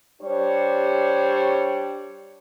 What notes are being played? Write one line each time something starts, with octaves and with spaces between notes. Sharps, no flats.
G3 D4 G4 C5 C#5